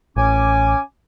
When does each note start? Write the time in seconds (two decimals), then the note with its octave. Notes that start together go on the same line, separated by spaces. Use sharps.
0.16 A1 C#4 G#5 D6